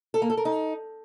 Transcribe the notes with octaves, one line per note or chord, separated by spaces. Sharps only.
A4
A#3
A4
A#4
D#4